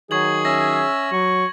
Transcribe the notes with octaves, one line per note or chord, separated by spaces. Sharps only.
D#3 F#3 G#4 C#6 G#6 F#7
C#4 E5 E6 G#6 A#6
F#3 C#6